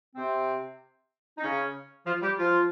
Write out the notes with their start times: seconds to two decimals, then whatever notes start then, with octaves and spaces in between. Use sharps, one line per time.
0.16 C3 C4
1.37 D#4
1.42 C#3 C#4
2.06 F3 F4
2.22 G3 G4
2.38 F3 F4